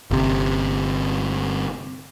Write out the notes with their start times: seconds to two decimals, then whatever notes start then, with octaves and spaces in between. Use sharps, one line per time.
0.11 G1 C3